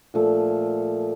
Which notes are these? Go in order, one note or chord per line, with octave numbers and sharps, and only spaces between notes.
A#2 F3 A3